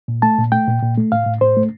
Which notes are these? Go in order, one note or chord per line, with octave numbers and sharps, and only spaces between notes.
A#2
A3 A5
A#2
A3 G5
A#2
A#2
A3
A2 F5
A2
A2 C5
A3